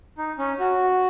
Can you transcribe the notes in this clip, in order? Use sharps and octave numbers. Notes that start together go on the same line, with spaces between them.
D#4
C#4
F#4